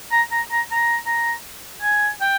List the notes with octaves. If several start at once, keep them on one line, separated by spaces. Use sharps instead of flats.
A#5
A#5
A#5
A#5
A#5
G#5
G5